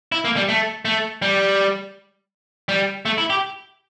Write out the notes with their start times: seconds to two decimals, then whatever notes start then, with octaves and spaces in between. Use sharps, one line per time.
0.12 E4
0.25 A#3
0.36 G3
0.49 A3
0.85 A3
1.22 G3
2.69 G3
3.06 A3
3.18 E4
3.30 G4